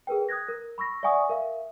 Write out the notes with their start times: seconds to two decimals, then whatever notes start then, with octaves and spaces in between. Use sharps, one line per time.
0.07 G#4 A#4 B4 G5
0.29 D#6 F#6 G#6 A#6
0.48 A#4
0.78 B5 C#6 E6 A#6
1.03 D5 E5 F#5 G#5 C#6 D#6
1.29 A#4 E5 F5